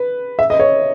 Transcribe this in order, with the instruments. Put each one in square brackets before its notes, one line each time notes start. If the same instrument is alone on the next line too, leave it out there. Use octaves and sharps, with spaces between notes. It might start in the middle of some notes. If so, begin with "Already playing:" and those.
Already playing: [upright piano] B4
E5
D#5
C#5